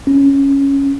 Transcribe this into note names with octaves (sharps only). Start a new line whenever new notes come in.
C#4